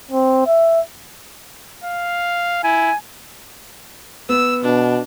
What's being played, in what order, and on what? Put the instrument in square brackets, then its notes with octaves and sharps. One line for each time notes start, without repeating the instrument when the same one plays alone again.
[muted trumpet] C4
E5
[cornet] F5
[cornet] E4 [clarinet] G#5
[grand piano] B3 [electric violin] E6
[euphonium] B2 [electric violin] D4